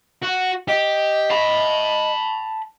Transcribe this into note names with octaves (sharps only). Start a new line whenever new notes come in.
F#4
G4 D#5
A5 B5